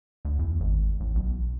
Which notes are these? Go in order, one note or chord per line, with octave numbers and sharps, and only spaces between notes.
D2
E2
G#1
A1
B1